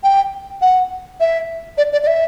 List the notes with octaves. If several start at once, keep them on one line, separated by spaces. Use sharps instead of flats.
G5
F#5
E5
D5
D5
D5
E5